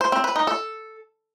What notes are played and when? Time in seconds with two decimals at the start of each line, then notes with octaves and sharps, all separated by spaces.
0.01 C5
0.12 C4
0.24 B4
0.36 D#4
0.47 A4